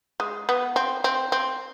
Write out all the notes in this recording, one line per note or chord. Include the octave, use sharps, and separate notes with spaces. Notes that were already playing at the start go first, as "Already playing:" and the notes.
G#3
B3
C4
C4
C4